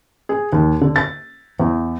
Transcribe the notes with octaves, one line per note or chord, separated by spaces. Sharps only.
G#4
D#2
D3
A6
E2